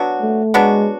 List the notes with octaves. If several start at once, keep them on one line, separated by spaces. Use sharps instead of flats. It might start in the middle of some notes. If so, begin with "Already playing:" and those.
Already playing: F#3 B3 D4 F#4
A3
F#3 G#3 B3 D4 F#4